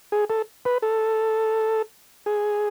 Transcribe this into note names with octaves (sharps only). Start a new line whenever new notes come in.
G#4
A4
B4
A4
G#4